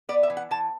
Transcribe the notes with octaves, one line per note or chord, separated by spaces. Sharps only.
B3 D5
E5
E3
F#5
E3 A5